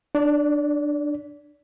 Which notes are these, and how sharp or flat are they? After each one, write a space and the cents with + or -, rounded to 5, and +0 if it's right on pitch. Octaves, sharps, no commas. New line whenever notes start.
D4 +15 D5 -35